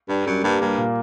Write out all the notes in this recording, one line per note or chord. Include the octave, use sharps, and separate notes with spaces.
G2 D4
F#2 G3
G2 A#3
G2 A#3
A#2